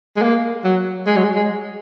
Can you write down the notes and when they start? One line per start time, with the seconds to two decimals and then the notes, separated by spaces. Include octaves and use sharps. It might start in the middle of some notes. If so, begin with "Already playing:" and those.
0.17 G#3
0.22 A#3
0.64 F#3
1.07 G#3
1.16 F#3
1.23 G#3
1.35 G#3